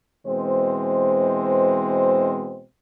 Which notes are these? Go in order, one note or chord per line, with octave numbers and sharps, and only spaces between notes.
B2 E3 G#3 C4 C5